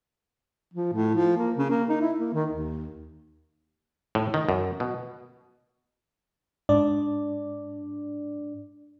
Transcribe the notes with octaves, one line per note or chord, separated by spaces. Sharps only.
F3
A2
F3
A#3
C#3
A#3
D#4
E4
A#3
D#3
D#2
A2
D#3
F#2
B2
G#2 D4 D5